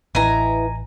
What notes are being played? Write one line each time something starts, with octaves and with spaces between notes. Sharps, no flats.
A1 E4 B4 D#5 G#5 A#5